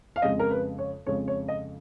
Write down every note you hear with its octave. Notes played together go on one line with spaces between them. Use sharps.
F5
F2 C#3 G#3 D#5
A#4
B4
C#5
F2 C#3 G#3 C#5
C#5
D#5